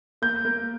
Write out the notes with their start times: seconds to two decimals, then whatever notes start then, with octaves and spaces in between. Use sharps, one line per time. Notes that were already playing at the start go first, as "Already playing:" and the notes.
0.22 A#3 G6
0.45 A#3